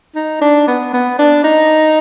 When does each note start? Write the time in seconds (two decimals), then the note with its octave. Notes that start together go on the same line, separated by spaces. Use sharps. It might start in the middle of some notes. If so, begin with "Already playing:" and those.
0.16 D#4
0.41 D4
0.68 B3
0.93 B3
1.19 D4
1.44 D#4